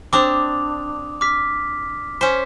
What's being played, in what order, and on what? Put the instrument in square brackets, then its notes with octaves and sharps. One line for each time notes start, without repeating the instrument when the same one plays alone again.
[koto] C4 D4 [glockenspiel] D6 D#6 F7
[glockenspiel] D6 F6 B6
[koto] C#4 C5 [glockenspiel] B6